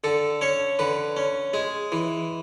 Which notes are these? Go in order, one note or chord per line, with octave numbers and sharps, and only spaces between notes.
D3 A4
C#4 C#5
D3 B4
C#4
G#3 G#4
E3